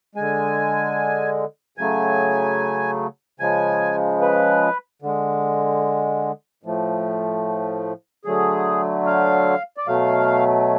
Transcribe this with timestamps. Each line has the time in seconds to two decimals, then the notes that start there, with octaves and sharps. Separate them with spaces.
0.15 D3 G#3 G#5
1.78 C#3 F#3 A3 G#5
3.40 C#3 F3 G#3 G#5
4.21 B4
5.02 D3 G#3
6.63 A2 F3 A3
8.25 D3 F#3 A3 G#4
9.06 F5
9.77 D5
9.87 B2 F#3 A3 F5